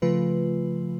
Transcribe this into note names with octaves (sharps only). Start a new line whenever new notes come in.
C#3 F3 A3 F4 B4